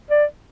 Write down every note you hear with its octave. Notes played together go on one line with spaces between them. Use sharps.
D5